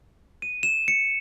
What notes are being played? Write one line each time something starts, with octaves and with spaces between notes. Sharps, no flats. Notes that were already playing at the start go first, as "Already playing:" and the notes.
D#7
E7
C#7